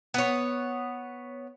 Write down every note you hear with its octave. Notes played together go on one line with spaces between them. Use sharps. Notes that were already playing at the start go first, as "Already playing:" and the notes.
B3 C#5